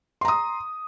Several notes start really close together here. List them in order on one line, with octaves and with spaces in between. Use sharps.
C6 A#5 D#6